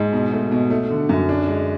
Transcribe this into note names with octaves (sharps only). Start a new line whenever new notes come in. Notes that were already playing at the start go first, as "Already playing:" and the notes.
Already playing: G#2 G#3
B2
A3
B2
A3
D3
F#2
D4
G#3